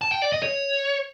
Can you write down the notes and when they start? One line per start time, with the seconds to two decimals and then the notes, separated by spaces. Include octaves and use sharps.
0.01 A5
0.12 G5
0.22 D5
0.32 D#5
0.43 C#5